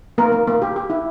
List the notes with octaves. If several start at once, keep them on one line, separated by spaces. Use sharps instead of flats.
A#3 A#4
A#3
A#3
G4
G4
E4